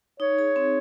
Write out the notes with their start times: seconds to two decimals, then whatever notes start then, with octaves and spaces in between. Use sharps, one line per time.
0.20 D#4 C#5
0.38 G#4
0.56 C4